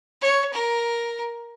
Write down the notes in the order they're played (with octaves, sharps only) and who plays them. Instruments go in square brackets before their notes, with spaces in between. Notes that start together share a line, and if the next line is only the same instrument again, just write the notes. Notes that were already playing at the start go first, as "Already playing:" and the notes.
[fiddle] C#5
A#4